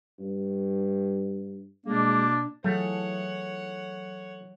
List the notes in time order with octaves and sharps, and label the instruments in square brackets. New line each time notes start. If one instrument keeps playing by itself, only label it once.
[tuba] G2
[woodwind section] B2 A#3 [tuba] G#3 [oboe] D4
[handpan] E3 G#4 F5 [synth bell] F#3 [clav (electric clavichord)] A3 [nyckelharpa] C#5 F#5